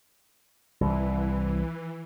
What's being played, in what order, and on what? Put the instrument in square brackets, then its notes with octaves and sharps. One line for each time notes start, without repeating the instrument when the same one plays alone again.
[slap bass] C2 [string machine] E3